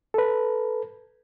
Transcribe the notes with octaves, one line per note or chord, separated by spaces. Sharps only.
A4 B4